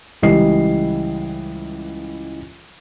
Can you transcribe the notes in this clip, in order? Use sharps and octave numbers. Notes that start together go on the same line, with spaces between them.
C#2 E3 G3 D#5 C7